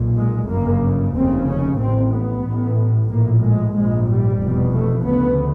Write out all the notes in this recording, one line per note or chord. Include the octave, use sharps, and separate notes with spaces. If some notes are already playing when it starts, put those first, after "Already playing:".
Already playing: B1 A#2
G#3
G1 F#2 C#3 A#3
F1 D#2 C#3 C4
C#4
A1 A2 C4
B3
A1 A2
A#1 A2 A#3
G#3
A#1 G#2 G#3
G3
F1 E2 B2
A3
D2 C#3 B3